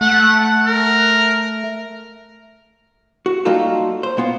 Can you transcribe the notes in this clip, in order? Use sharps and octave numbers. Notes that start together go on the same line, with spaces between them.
A3 F#5
F#5
A#4
F#4
G3 A#3 D#4 F4 F#4 A4
C5
A#2 B3 F4